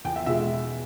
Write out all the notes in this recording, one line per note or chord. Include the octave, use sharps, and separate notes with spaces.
E2 G5
E5
B2 G#3 E5